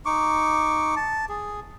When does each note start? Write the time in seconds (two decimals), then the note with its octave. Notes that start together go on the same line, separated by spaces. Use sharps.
0.05 D#4 C#6 D6
0.96 A5
1.29 G#4